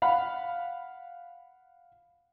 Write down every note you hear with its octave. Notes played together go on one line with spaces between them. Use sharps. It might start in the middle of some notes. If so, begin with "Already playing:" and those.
F5 F#5 B5